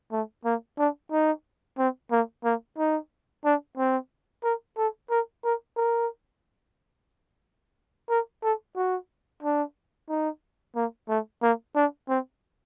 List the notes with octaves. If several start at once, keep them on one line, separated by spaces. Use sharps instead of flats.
A3
A#3
D4
D#4
C4
A#3
A#3
D#4
D4
C4
A#4
A4
A#4
A#4
A#4
A#4
A4
F#4
D4
D#4
A#3
A3
A#3
D4
C4